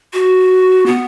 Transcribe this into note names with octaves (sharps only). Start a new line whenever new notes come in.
F#4
B3